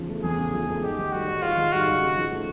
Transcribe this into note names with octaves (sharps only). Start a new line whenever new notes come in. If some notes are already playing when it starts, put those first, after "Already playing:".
Already playing: E2 C#3 F3
A3
E2 G#4
C#3
F3
A3
G#2 G4
D#3
G3 F#4
G#2
G#2 F4
D#3
G3 F#4
G#2
C#3
F3
A3